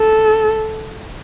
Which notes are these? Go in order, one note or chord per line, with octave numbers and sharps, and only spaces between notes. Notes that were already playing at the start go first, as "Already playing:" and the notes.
Already playing: A4